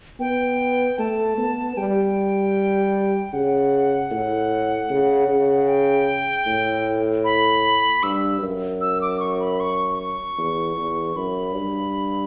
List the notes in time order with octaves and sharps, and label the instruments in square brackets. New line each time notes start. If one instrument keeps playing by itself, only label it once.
[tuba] B3 [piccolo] G5
[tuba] A3 [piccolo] A5
[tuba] B3
[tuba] G3 [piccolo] G5
[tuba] C#3 [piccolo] F#5
[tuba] A2
C#3
C#3
[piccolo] G5
[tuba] A2
[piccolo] B5
[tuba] G2 [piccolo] E6
[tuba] F#2
[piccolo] E6
D6
C#6
B5
C#6
C#6
[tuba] E2
E2
[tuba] F#2 [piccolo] B5
[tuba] G2